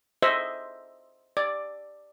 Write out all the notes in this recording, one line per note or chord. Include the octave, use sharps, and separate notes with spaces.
C5 D#5 E5
D5